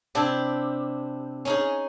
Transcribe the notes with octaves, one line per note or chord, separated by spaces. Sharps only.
C3 D4 E4 G4
C#4 D#4 G#4